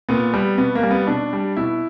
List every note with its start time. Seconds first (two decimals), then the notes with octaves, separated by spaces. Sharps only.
0.09 A#2 B3
0.34 G3
0.58 B2 B3
0.75 A#3
0.83 G3
0.91 B3
1.07 B2 D4
1.33 G3
1.57 B2 E4